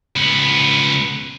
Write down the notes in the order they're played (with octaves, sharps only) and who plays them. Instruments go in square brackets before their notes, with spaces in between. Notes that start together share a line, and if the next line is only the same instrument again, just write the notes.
[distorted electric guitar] C#2 B3